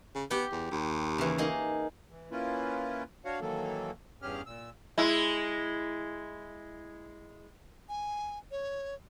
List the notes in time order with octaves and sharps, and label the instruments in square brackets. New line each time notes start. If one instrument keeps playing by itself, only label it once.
[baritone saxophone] C#3
[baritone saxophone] B3 [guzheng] G4 G5
[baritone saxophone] E2
D#2
[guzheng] C#3 E3
A#3 D#4 G#4
[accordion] E3
A#3 C#4 E4 F4 B4
D4 F#4 C#5 F5 F#5
D#3 E3 F#3 A#3 A4
E2 G2 C#4 G4 G#4 F6
A#2 E6
[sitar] G#3 E4
[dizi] G#5
C#5